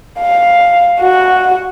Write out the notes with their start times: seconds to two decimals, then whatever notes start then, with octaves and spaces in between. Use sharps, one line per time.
0.20 F5
1.00 F#4